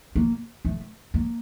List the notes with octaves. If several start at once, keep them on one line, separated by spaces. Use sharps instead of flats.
A#3
A3
A#3